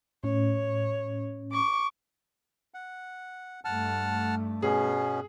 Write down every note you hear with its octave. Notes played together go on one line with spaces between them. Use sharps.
A2 C#4 C#5
C#6 D6
F#5
G2 A3 F#5 A5 F6
B2 B3 C#4 G#4